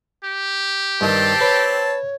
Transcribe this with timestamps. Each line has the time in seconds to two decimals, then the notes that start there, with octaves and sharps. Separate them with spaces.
0.25 G4
1.01 G2 D#3 C4 A4 A5
1.41 B4 C#5